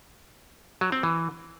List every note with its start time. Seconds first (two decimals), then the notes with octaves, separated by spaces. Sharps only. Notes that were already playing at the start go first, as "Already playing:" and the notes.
0.81 F#3
0.92 C4
1.03 E3